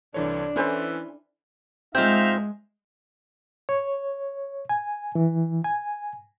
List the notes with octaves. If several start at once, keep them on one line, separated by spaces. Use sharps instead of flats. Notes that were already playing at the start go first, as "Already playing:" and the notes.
C2 D3 E3 D4 C#5
E3 C#4 E4 A4 C5 G#5
G#3 C4 D#4 F4 E5 F5 G6
C#5
G#5
E3
G#5